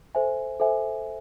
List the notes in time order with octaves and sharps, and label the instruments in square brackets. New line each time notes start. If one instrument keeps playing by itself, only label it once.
[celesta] A4 C5 E5 G#5
A4 C5 E5 G#5